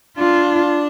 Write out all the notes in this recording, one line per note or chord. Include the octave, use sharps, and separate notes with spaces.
D4 F4